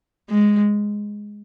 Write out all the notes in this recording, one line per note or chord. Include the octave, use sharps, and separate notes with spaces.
G#3